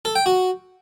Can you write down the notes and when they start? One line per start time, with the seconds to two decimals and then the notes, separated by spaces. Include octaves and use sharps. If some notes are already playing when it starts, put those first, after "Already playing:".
0.05 A4
0.15 G5
0.26 F#4